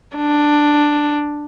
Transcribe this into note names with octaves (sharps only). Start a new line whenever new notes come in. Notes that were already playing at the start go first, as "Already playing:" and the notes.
D4